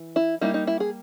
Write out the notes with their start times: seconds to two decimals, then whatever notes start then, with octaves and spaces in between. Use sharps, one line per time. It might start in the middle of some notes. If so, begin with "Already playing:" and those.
Already playing: E3
0.16 E4
0.41 G3 A#3 D#4 E4
0.54 D#4
0.67 E4
0.80 G#4